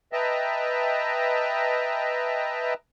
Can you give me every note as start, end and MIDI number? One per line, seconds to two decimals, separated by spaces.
0.13 2.74 71
0.13 2.74 75
0.13 2.74 76
0.13 2.74 79
0.13 2.74 81
0.13 2.74 82